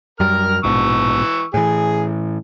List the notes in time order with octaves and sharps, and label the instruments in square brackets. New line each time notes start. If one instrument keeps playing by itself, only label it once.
[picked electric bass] F#2 G3 [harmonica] A#4 F6
[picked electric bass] A#1 G#2 B2 [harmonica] E3 C#6 E6
[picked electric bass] A2 E3 [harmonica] G#4